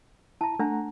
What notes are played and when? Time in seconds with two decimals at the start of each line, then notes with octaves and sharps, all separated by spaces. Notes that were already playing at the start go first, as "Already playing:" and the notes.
0.41 E4 A5 A#5
0.59 A3 D4 F#5 A#5